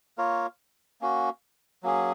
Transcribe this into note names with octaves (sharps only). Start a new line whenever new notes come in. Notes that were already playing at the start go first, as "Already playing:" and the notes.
A#3 F4 A#4 C#5
A#3 C#4 F#4
F#3 A#3 C#4 G#4